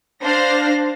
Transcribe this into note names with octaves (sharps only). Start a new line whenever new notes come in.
D4 C5 F5 A#6